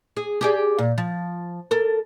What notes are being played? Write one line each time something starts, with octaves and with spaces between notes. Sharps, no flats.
G#4
G4 G#4 D5
A#2
F3
A4 A#4